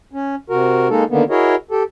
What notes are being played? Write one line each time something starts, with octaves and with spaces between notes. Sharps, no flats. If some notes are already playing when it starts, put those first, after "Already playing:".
C#4
C3 F#4 A#4
G#3 A#3 D#4 A4
D3 D#3 A#3 B3
E4 F#4 G#4 A#4 C#5 D#5
G4 A4